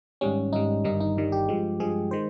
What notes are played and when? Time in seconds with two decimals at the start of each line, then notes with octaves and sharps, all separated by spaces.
0.21 G#1 G#2 G3 C#4
0.53 G#1 G#2 G3 D#4
0.84 G1 G2 D#3 G3 D#4
1.00 D#4
1.16 G1 G2 D#3 G3
1.32 G4
1.49 G2 F3 G#3
1.80 G2 F3 G#3 G#4
2.11 D#3 G#3 C5